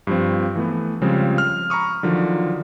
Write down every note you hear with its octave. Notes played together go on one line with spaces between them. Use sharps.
G2 F3 C4
E3 A3 B3
C#3 F3 G3 G#3 C4
F6
A#5 B5 C#6 D#6
D3 D#3 F3 F#3